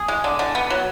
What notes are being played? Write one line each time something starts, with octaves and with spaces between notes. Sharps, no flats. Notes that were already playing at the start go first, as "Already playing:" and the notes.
Already playing: G#4
G#3
D3
D3
B3
F#3